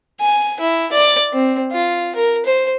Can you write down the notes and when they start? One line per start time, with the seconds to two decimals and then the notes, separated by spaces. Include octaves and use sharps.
0.20 G#5
0.60 E4
0.92 D5
1.33 C4
1.72 F4
2.15 A#4
2.45 C5